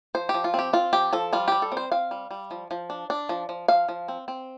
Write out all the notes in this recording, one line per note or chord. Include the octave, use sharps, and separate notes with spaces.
F3 C5
G4
F3
F4
C4 G4
C4 F4
F3 G4
F3 A4
G3 F4
G3 G4
A4
C4
C5
C4 F5
G3
G3
F3
F3
D4
D4
F3
F3
F3 F5
F3
C4
C4